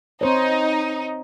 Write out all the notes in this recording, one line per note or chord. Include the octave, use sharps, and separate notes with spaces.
C4 D#4 C5 C#5